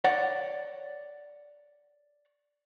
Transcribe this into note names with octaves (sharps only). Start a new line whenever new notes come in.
C#5 D5 F#5